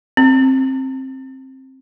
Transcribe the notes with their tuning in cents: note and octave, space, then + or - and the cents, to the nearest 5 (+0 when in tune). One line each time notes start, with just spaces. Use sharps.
C4 +15